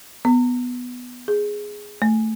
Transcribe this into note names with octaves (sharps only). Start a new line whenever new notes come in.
B3
G#4
A3